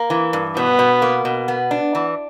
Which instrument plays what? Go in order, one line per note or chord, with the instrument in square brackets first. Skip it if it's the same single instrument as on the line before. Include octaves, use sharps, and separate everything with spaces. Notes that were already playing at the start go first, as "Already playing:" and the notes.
Already playing: [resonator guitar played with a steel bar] A#3
E3
G2
[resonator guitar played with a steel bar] B2 [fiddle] B3
[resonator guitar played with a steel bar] B2
A#3
B2
B3
D4
E3